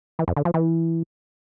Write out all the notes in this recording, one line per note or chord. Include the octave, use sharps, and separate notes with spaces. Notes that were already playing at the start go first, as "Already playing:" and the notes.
E3
F2
D3
F3
E3